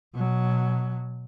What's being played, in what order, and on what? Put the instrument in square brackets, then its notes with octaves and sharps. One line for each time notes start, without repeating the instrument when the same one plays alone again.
[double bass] B2 F#3